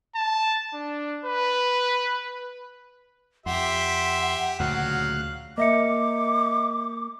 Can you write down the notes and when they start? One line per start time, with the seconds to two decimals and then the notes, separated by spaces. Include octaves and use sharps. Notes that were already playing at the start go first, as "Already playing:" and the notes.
0.15 A5
0.74 D4
1.25 B4
3.46 F2 G4 E5 F#5 C6
4.60 D2 A#2 C#3 F#3 F5 F#6
5.58 A#3 D#5 E5 D6 C#7